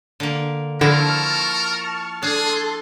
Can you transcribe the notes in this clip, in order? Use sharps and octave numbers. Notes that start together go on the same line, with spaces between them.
D3 A#3
D3 F3 E4 A#4 A5 C#6 F6
D4 G#4 A4 A5 C6